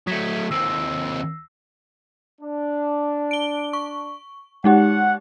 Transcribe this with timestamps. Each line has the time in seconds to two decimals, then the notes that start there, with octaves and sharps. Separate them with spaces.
0.07 F#3 A3 D#6 G#6 B6
0.51 D#2 C4 E6 A#6 C7
2.41 D4
3.31 D7 G7
3.73 C#6
4.64 G#3 D#4 G4 F#5